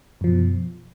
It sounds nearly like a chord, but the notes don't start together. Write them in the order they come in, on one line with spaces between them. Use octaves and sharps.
F#2 F3 B2